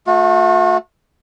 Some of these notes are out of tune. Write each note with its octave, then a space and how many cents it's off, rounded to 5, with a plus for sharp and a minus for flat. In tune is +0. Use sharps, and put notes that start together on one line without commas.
A3 +0 F#4 -40